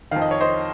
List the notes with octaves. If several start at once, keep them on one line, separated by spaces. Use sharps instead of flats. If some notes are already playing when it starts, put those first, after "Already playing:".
F2 D#3 F5
D#5
C#5
C5 D#5